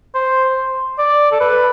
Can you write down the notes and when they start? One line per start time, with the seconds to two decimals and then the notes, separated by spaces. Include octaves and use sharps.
0.15 C5
0.99 D5
1.32 A4
1.40 B4